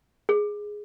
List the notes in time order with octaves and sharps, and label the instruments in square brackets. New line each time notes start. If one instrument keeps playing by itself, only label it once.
[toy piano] G#4